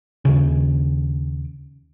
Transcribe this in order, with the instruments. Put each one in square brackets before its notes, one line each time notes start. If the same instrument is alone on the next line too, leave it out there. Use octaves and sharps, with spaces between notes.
[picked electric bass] D#2 C#3